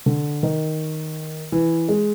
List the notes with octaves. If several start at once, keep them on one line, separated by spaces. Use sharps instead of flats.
D3
D#3
E3
G#3